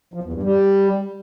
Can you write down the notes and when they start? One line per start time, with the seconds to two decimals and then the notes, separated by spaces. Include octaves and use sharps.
0.14 F3
0.23 E2
0.33 G2
0.43 G3